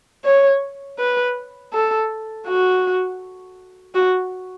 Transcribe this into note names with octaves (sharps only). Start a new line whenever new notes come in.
C#5
B4
A4
F#4
F#4